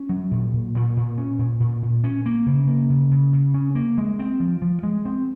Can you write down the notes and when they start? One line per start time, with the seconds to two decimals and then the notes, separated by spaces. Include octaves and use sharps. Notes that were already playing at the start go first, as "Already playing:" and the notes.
Already playing: C#4
0.09 F#3
0.31 A#2
0.53 A#2
0.75 A#2
0.97 A#2
1.18 C#4
1.39 A#2
1.60 A#2
1.83 A#2
2.04 C#4
2.26 A#3
2.46 C#3
2.68 A#3
2.90 C#3
3.11 C#3
3.33 C#3
3.54 C#4
3.75 A#3
3.98 G#3
4.19 C4
4.40 F3
4.62 F3
4.83 G#3
5.05 C4